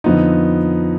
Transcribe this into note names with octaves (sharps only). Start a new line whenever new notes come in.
F2 D3 F3 B3 D#4